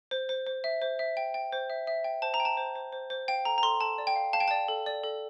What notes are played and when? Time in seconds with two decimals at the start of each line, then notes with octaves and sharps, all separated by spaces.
0.11 C5
0.29 C5
0.47 C5
0.64 E5
0.82 C5
0.99 E5
1.17 G5
1.34 G5
1.53 C5
1.70 E5
1.87 E5
2.04 G5
2.22 C5 A5
2.34 A#5
2.40 G5
2.45 A5
2.57 C5
2.75 C5
2.92 C5
3.10 C5
3.28 F5 G5
3.45 A4 A#5
3.58 A#5
3.63 A4 C6
3.80 A4 A5
3.98 D5
4.07 G5
4.16 F5
4.33 F5 A5
4.40 G5
4.48 D5 A5
4.68 A4
4.86 D5
5.04 A4